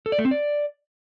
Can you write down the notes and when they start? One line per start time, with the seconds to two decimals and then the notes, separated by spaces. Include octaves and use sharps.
0.06 A4
0.12 D5
0.19 A3
0.25 C4
0.31 D5